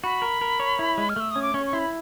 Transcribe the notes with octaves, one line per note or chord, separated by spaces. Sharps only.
F#4 B5
A#4
A#4
C#5
E4
G#3
F6
A3 E6
C#4 D#6
D6
C#4 C#6
C#6
E4 C6
B5